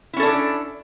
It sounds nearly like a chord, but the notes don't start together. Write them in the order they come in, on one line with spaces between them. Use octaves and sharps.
E4 C#4 A4 D4